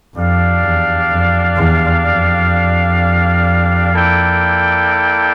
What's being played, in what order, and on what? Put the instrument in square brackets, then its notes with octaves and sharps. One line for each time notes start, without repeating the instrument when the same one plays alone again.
[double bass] F2 [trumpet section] D4 G4 D5 F5
[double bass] E2
F2
E2
F2
[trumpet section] A#3 E4 A4 D5 G5